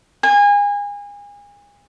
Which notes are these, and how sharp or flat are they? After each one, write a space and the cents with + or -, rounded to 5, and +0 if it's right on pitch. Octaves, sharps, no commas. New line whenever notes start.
G#5 -30